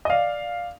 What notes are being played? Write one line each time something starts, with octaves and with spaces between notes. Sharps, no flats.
D#5
D5 F5